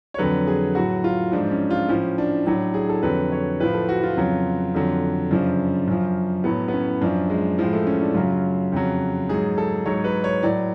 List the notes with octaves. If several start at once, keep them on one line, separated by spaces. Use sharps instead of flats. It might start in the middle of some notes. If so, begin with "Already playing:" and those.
C#5
F2 D3 F#3 B4
G#4
A2 F#3 F#4
F4
G#2 F3 D4
C#4
F4
A2 F3 C#4
D4
A2 F#3 D4
G#4
A4
F2 D3 F#3 B4
C#5
A2 F3 B4
A4
F#4
F4
F2 C#3 F#3
F2 D3 F#3
F#2 C#3 F3 D4
F#2 F3
A2 F#3 B3
B3
C#4
F#2 F3 D4
G#3
A2 F3 G#3
A3
C#4
D4
F#2 C#3 F#3 F4
F2 C#3 F#3
G#2 F#3 G#4
A4
G#2 F#3 C#5
B4
C#5
A2 F#3 D5